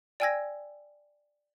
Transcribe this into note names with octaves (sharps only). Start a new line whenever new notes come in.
D5 G5 G#5 E6 G#6 A#6